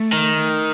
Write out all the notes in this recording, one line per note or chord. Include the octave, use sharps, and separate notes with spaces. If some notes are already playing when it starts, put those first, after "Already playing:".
Already playing: A3
D#3